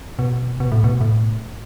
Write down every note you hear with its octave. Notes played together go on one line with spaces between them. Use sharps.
B2
B2
A2
B2
A2